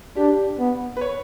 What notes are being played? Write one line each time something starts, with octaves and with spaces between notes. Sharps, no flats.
D4 G4
B3
B4
C#5